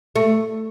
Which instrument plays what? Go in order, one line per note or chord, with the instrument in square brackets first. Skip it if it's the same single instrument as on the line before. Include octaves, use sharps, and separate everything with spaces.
[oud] A3